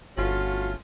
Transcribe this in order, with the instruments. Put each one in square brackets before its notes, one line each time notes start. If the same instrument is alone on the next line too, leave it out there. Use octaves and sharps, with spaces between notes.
[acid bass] G1 [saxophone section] A3 C#4 F4 [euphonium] F#4